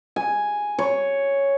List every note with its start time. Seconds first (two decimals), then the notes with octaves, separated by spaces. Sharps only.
0.16 G#5
0.78 C#5